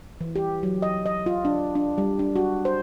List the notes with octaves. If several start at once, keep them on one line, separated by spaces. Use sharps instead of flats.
E3
G4
F#3
D#5
D#5
F4
D4
D4
G3
D4
F#4
C5